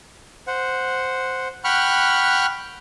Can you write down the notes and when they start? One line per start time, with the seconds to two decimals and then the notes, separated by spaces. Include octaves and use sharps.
0.47 C5 F#5
1.64 F#5 G5 B5 C#6 F6 F#6